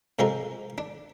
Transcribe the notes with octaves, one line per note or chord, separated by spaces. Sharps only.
C3 G#3 C4 F4 A4 A#4
D4